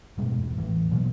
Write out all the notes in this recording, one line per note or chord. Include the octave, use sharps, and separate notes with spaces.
G#2 B2 G3 G#3
E2
A1 E3
B2 F#3 A#3